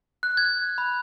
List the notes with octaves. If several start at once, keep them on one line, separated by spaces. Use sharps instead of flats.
F#6
G#6
B5